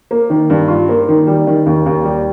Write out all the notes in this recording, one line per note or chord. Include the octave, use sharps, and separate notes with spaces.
A#3
D#3
G2
F4
A#3
D#3
G3
D#3
D#2
D#2
G3